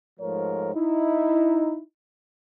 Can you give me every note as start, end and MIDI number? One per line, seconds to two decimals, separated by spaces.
0.20 0.75 44
0.20 0.75 53
0.20 0.75 57
0.20 0.75 70
0.20 0.75 73
0.75 1.81 63
0.75 1.81 64